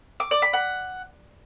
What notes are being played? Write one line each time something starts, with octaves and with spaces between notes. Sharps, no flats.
D6
D5
B5
F#5